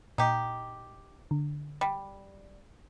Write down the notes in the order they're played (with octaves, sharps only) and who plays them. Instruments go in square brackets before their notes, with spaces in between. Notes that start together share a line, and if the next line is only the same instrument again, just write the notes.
[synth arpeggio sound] A#2 [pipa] D#4 G4
[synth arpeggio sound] D3
[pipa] G3